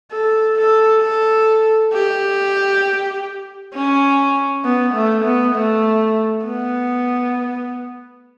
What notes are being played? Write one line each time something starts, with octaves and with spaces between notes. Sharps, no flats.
A4
A4
A4
G4
C#4
B3
A3
B3
A3
B3